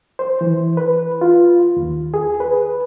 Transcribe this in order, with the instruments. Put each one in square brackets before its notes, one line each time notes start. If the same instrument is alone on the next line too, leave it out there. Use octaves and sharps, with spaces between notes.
[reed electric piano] C5
E3
B4
F4
D#2
G#4
B4